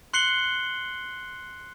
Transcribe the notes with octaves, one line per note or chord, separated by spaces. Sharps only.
C6 F#6 C7 C#7 F#7 G7